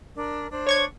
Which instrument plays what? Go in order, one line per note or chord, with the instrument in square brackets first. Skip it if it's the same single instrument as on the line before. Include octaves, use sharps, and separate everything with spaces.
[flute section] D4 A#4
D4 C5
[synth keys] C#5 C#6 G#6